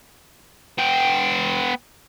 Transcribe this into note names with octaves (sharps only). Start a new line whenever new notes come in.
B3 G5